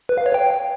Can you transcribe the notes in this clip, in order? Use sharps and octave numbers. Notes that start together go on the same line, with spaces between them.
B4
F5
C#5
G5